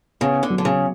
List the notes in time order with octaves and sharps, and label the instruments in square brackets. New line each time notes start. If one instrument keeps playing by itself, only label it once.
[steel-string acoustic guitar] C#3 [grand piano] B3
[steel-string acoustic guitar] D3
[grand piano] F#3
[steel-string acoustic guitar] D3
C#3